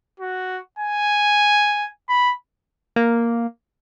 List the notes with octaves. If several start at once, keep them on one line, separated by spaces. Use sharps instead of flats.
F#4
G#5
B5
A#3